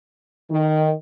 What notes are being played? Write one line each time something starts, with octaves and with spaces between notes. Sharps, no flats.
D#3